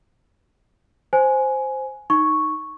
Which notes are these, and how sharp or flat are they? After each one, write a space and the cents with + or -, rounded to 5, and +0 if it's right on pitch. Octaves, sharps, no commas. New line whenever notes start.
C5 +0 G#5 +10
D#4 +0 C#6 +0